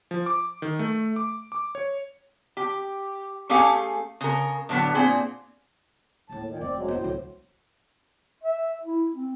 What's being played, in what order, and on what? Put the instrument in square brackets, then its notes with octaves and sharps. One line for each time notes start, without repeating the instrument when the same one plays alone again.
[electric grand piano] F3
D6
D#3
A3
D6
D6
C#5
[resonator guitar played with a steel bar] G4
A3 C#4 G4 G#4 F5 G#5
C#3 A#4
A2 D3 F#3 B3
A#2 C4 G#4
[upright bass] D#1 A#3 [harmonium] A2 A5
[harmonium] A#2 D#3
[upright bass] F1 [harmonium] C4 D5
[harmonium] F#2 F#3 G#3
[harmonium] D2 A2 C5 [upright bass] B3 C4
[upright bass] C2 F#3
[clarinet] E5
E4
C4